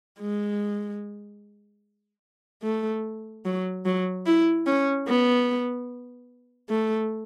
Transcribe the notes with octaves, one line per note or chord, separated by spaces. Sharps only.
G#3
A3
F#3
F#3
E4
C#4
B3
A3